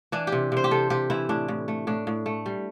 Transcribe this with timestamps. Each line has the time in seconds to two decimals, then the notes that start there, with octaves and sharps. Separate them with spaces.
0.12 E3 D4
0.27 G4
0.32 C3
0.52 C3 C5
0.64 G4
0.71 C3 A4
0.90 C3 G4
1.10 E3 E4
1.29 A2 D4
1.48 A2
1.68 A3
1.87 A2 D4
2.07 A2
2.26 A3
2.46 G3